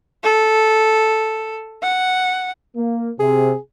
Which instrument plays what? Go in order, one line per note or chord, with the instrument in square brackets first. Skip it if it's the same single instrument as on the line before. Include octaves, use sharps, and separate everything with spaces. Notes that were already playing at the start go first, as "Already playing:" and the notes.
[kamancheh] A4
F#5
[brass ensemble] A#3
[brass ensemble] C3 [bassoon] G#4